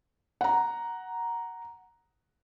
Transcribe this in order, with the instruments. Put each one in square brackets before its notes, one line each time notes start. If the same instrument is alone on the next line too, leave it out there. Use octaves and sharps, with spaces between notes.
[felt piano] F#5 A#5